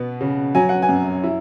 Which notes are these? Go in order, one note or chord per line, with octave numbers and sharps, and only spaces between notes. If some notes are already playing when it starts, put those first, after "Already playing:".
Already playing: B2 B3
C#3
F#3 G#5
F#5
G#5
F#2
E4